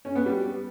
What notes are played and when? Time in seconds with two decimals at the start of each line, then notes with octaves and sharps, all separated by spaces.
0.05 C#4
0.15 B3
0.26 G3